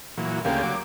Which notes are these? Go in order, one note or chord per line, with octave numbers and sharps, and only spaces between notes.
A#2 E3 F#3
D2 C#3 A#3 G4
F#3 D6